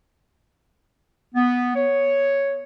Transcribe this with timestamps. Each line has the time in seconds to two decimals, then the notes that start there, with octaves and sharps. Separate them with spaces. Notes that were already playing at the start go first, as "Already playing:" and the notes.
1.35 B3
1.76 C#5